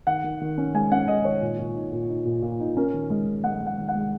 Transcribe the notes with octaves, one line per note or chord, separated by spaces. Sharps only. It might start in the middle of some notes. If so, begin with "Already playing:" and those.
D#3 F#5
D#3
D#3
C#4
G#3 G#5
C#4 F#5
D#3 D#5
D#3 C#5
A#2
A#2
D#4
A#2
D#4
A#2
A#2
D#4
C#4 A#4
D#3
G#3
D#3
G#3 F#5
G#3
F#5
D#3
F#5
G#3